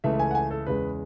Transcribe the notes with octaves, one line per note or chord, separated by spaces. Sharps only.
C#2 C#3 E3 A3 E5
G#5
F#5
G#5
A4
E2 C#3 G#3 B4